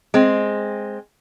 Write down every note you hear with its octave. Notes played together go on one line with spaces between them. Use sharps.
G#3 C4